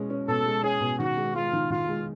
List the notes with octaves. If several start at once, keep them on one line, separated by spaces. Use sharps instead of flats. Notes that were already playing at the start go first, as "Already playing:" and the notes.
Already playing: B2 G#3 C#4
C#4
B2 A4
G#3
C#4 G#4
B2
D#3 F#4
G#3
G#3 F4
D#3
D#3 F4
G#3